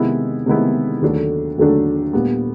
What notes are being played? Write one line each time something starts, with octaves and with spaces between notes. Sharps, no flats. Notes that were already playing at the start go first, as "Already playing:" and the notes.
Already playing: C3 D#3 G#3 B3 E4
C3 D#3 G#3 B3 E4
D#2 D3 F#3 A3 D4
D#2 D3 F#3 A3 D4
A#2 G3 B3